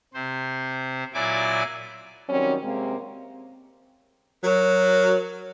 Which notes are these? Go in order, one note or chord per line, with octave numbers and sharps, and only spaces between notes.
C3 C5
A#2 F#3 E4 D5 G#5 D6
D#3 F#3 G3 C4 C#4
C3 G#3 A#3 C4
F#3 A#4